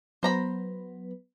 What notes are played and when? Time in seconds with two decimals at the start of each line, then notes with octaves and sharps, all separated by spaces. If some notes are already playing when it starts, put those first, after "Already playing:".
0.23 F#3 B3 B4 C5 A#5 B5